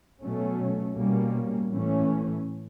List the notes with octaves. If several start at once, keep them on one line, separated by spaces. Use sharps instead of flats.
B2 F#3 A3 C#4
B2 G3 A#3 C#4
A2 E3 A3 C#4